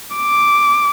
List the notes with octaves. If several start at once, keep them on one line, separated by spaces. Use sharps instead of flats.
D6